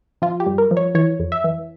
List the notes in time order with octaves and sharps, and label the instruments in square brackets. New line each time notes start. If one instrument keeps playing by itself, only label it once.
[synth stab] F3 F4
G4
G2
A#4
F3
C#5
E3 C#5
F2
E5
E3